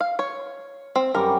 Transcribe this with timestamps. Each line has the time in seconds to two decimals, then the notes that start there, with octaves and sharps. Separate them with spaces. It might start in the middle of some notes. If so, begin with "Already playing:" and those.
0.01 F5
0.19 C#5
0.96 C4
1.15 F#2 G3 A#4 D6